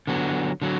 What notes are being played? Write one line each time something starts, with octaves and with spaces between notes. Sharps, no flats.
D3 F#3 B3
D3 F#3